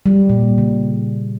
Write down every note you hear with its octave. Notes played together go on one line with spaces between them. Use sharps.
G3
A#2
C#3